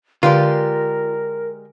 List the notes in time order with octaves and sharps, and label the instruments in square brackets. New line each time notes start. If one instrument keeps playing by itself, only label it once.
[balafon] D3 [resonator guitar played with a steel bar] G#3 G4 D5 [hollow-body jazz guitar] F4 [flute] A#4